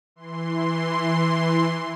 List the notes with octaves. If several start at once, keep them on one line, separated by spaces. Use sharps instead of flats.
E3 C6